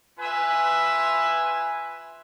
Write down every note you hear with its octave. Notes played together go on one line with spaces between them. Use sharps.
F4 B4 E5 G#5